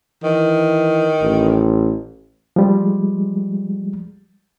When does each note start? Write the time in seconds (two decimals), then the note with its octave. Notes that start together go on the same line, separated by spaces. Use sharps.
0.24 D#3 E3
1.22 A1
2.56 F3 G3 G#3